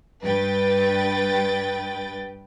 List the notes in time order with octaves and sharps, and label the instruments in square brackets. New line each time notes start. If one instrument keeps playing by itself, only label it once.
[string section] G2 B4 G5 A6